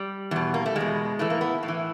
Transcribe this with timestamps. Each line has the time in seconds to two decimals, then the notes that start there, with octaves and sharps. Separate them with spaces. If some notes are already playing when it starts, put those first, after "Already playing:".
Already playing: G3
0.31 E2 B2
0.54 A#3
0.66 A3
0.76 E2 B2 G#3
1.19 A2 E3 A3
1.30 A#3
1.41 B3
1.63 A2
1.68 E3